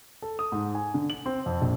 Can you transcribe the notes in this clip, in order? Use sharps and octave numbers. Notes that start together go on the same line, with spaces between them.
A4
D#6
G#2
G#5
D3
F#7
C4
F2
A#1